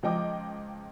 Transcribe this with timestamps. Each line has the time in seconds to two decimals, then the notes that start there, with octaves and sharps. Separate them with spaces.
0.03 C#2 F3 D#5 G5 D6